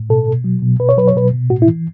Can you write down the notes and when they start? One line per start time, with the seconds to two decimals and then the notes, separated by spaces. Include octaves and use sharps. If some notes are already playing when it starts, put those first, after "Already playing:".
Already playing: A2
0.09 B2 A4
0.28 B2
0.44 F#3
0.62 B2
0.80 B2 B4
0.89 C#5
0.97 F#3 B4
1.07 C#5
1.16 B2 B4
1.33 B2
1.50 A2 F#4
1.62 E4
1.68 E3